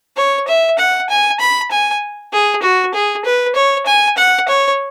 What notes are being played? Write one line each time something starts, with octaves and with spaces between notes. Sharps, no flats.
C#5
E5
F#5
G#5
B5
G#5
G#4
F#4
G#4
B4
C#5
G#5
F#5
C#5